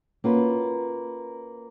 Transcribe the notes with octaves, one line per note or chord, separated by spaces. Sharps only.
A#3 C#4 F4 F#4 B4